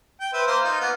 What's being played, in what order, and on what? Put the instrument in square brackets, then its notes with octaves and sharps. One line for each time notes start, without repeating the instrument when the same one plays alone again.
[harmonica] G5
B4 C5 E5
A#3 C5
D#4 F4
A#3 B3